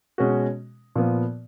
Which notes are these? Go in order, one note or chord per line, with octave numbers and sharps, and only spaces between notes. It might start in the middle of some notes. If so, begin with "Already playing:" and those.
B2 G#3 C#4 F#4
A#2 F3 B3